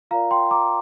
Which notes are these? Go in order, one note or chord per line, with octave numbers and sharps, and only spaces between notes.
F4 A#4 D5 F5 A#5
G5 C6
A#5 D6